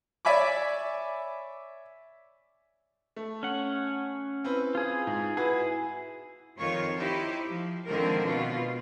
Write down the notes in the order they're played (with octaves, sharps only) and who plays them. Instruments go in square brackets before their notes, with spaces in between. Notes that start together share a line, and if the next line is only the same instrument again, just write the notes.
[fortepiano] C#5 D5 E5 G#5 B5 D6
[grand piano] A3
[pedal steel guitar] C#4 F#5
[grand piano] C4 E4 B4
[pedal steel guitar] F4 G#4
[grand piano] G#2
[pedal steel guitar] E4 G#4 [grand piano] F#4 B4
[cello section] F2 D#3 F4 C#5
D#4 E4 G4 C5
F3
G#2 D3 D#3 F3 C4 A#4
B2 F4